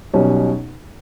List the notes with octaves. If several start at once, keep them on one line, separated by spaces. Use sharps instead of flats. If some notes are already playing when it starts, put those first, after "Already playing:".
B1 B2 G3 C#4